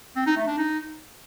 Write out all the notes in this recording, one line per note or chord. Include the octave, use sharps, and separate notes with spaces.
C4
D#4
A3
D4
D#4